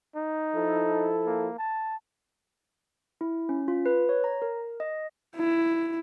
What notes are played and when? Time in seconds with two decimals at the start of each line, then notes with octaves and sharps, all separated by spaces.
0.16 D#4
0.55 F3 E4 A4
1.26 A#3
1.58 A5
3.21 E4
3.49 C#4
3.68 F4
3.86 B4
4.09 C#5
4.24 A#5
4.42 A#4
4.80 D#5
5.37 E4